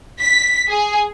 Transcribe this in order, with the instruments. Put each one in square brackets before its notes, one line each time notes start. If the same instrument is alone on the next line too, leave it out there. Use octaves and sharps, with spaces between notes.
[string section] B6
G#4